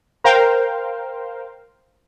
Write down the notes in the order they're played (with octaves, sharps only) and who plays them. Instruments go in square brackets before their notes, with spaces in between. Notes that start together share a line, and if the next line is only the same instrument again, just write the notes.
[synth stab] A#4 C5 F5 G5